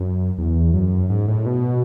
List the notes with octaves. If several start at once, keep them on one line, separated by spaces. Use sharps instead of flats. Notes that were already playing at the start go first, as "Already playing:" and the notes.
Already playing: F#2
E2
F#2
G#2
A2
B2